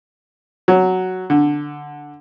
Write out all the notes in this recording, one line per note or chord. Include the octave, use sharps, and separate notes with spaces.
F#3
D3